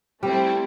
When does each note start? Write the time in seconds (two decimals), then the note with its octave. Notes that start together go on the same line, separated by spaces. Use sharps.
0.22 G3 A3 C4 E4